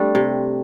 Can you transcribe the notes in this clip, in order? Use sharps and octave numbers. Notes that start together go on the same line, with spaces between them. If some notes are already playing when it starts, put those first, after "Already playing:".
Already playing: G3 A3 C4 D4
C3